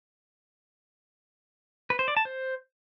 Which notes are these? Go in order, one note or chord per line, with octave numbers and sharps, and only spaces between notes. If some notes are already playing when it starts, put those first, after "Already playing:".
B4
C5
D5
A5
C5